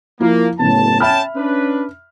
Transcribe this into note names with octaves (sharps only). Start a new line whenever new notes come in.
F3 A#3 E4
F#1 A2 C#3 B3 A5
C#4 E5 G5 A5 B5 F6
C#4 D4 B4